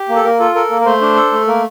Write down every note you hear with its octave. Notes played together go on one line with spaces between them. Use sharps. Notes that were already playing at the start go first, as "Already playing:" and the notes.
Already playing: G4
A#3
A4
A#3 A#4
F4 A4
A4 A#4
A#3
A#4
A3 C5
D4
A4
A3
A#3 A#4